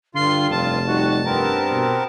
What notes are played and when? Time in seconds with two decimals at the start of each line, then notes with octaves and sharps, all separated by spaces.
0.15 G2 D3 F4 C6
0.51 F1 A5
0.87 G3 D#4 F#4
1.25 G2 B3 C4 A#4
1.71 B2